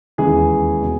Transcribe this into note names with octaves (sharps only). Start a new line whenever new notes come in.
E1 D#2 C#3 E3 G#4
B2